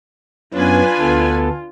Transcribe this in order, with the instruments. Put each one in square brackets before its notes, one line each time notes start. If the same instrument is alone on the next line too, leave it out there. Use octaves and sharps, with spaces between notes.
[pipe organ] F#2 B3 C#4 [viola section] D4 B4 G#5 [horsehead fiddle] F4
[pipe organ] D2 B3 A4